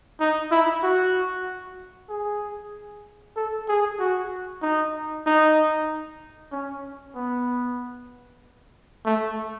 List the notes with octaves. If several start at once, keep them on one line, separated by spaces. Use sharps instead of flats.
D#4
E4
F#4
G#4
A4
G#4
F#4
D#4
D#4
C#4
B3
A3